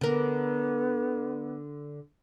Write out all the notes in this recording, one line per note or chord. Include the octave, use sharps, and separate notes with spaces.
D3 B3 A#4